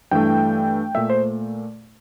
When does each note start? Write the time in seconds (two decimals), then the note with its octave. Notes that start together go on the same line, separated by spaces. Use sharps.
0.11 G2 E3 A3 G5
0.95 A#2 A3 E5
1.10 C5